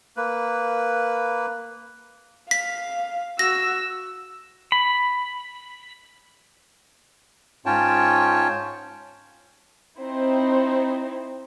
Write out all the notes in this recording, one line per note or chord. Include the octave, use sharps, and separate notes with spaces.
A#3 B4
F5 B6
F#4 E6 A#6
B5
G#2 C#4 F4 C#5 G5 A5
C4 D#4 E4 C5